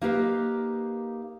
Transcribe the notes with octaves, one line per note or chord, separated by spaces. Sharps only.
A#3 D#4 G4 A#4 B4 F5